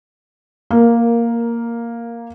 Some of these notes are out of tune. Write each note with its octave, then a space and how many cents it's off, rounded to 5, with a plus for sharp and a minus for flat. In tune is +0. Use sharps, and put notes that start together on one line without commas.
A#3 +0 A#4 +10